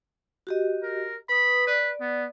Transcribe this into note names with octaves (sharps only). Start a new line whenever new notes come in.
F#4 G4 D#5
A#4
B4 B5 D#6
B4 D5
B3